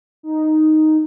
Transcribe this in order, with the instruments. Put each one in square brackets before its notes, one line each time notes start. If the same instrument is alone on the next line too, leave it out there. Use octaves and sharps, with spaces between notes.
[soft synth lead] D#4